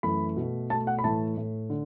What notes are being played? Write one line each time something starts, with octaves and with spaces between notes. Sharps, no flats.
F#2 E3 A3 B5
B2 A3
B2 A3 A5
F#5
B5
A2 E3 A3 A5
A2 A3
D3